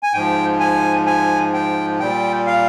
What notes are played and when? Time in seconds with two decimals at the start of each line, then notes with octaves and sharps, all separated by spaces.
0.03 G#5
0.13 G#2 F3 G5
0.60 G#5
1.06 G#5
1.53 G5
2.00 A#2 G3 G5
2.47 F5